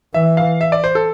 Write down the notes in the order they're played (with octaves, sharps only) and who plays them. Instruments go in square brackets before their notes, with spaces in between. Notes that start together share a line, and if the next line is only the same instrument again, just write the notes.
[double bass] E3 [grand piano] E5
[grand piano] F5
E5
D5
C5
A4